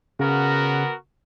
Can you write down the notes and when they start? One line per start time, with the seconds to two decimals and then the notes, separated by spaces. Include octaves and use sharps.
0.19 C#3 B3 F#4 A#4